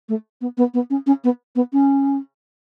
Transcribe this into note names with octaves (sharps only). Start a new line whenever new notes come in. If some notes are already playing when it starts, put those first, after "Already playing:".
A3
B3
B3
B3
C#4
C#4
B3
B3
C#4